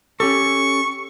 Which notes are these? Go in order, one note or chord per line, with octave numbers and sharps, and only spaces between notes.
C#4 G4 A4 C#6